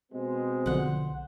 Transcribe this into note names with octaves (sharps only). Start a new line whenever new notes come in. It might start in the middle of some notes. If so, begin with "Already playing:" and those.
B2 G#3 C4
B1 D3 F3 C5 F#5